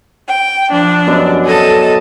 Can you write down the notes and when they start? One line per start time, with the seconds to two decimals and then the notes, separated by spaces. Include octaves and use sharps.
0.28 G5
0.70 F3 D4
1.07 F#2 B2 D5
1.45 A4 D#5 A5